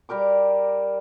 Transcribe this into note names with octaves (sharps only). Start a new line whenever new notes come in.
G3 G4 A#4 D6